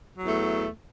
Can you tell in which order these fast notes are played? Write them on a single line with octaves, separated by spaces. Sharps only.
F#3 E2 A3